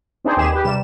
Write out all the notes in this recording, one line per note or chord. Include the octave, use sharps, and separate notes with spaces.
C4 D4 D#4 G#4 C5
D#2 G4 G#4 E7
G4 B4
C3 G3 E7